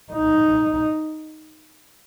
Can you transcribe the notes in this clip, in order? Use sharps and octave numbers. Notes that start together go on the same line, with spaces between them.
D#4